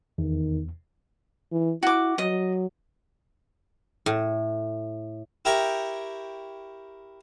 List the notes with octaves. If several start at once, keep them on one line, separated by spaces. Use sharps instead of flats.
E2 D#3
E3
E4 F#4 D6
F#3 D#5
A2
E4 G4 A#4 G5 A#5 C#6